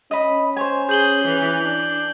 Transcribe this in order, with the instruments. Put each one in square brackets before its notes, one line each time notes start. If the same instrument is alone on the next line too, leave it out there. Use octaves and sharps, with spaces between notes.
[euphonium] C#4 [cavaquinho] D#5 B5
[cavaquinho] C5 C#5 G#5
[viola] G#4 [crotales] G6 F#7 G7
[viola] E3
D4